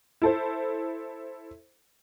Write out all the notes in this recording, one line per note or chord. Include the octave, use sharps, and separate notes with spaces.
E4 A4 C5